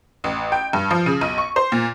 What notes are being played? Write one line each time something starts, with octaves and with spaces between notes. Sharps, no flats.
A1
G5
G2
F3
C#3
B1
C#6
C5
A#2